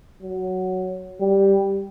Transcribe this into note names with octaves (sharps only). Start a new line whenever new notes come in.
F#3
G3